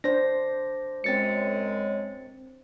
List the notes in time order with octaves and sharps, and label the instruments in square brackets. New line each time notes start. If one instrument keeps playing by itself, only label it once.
[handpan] D4 C5 [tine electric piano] A#6
[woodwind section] F#2 G#3 [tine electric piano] C4 A6 C#7